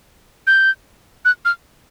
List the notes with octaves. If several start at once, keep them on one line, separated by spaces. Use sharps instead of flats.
G6
F#6
F6